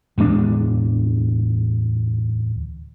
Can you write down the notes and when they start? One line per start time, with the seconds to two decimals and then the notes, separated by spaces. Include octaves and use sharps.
0.18 D1 E2 G#3 D4